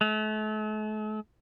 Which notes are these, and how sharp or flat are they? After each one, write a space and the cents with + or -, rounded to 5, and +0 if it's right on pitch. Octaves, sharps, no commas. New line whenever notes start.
A3 -40